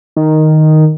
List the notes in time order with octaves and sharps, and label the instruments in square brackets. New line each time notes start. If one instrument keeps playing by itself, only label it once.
[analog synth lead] D#3